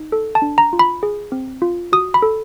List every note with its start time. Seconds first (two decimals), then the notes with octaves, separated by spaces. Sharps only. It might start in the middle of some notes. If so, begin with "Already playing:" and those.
Already playing: D#4
0.12 A4
0.35 A5
0.42 D4
0.58 A#5
0.73 F4
0.79 B5
1.03 G#4
1.32 C4
1.62 F4
1.93 F#4 D#6
2.14 B5
2.22 A4